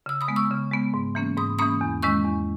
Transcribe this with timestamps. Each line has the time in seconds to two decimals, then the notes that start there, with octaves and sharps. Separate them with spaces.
0.06 C#3 E6
0.21 B5 D#6
0.28 G#3 B3
0.36 C#6 E6
0.51 C#3
0.71 G#3 B3
0.94 G#2
1.15 E3 A#3 C#4
1.37 G#2 B5 D#6
1.59 E3 A#3 C#4 B5 D#6
1.81 E2
2.03 D#3 G#3 C#4 C#6 E6
2.25 E2